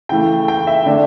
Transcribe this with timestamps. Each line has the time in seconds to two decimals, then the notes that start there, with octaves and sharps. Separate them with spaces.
0.09 C#3 E3 A3 G5
0.48 G5
0.67 E5
0.86 D3 A3 D4